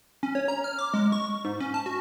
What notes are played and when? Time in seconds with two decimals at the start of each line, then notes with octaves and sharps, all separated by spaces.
0.23 C#4
0.35 C#5
0.48 A#5
0.64 F6
0.78 D6
0.94 G#3
1.12 C#6
1.45 G#2
1.60 C#4
1.74 A5
1.86 F#4